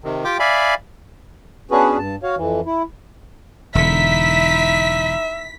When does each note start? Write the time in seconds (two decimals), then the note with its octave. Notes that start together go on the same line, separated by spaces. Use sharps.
0.04 C3 D#3
0.24 F4 G4 G5 D6
0.40 D5 E5 F5 G#5 B5
1.71 B3 C#4 D4 F#4 G#4 B4
1.98 G2 A5
2.23 F#4 C#5 F5
2.37 F2 E3
2.66 E4
3.75 E1 D3 D#4 E4 E5 B6